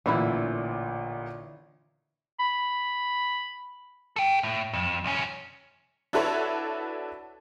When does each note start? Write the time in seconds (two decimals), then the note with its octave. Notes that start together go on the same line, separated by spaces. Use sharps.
0.06 A1 A#2 D3 E3 E4 B5
2.39 B5
4.16 A4 G5
4.43 A2
4.73 F2
5.04 C2 C#4
6.13 D4 E4 F#4 A4 B4 C#5